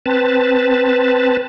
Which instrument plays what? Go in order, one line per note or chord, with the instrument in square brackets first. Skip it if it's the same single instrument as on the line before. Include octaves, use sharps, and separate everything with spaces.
[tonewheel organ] C4 B4 A5